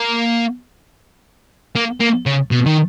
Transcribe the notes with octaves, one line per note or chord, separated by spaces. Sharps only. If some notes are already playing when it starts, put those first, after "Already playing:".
Already playing: A#3
A#3
A#3
C#3
B2
D#3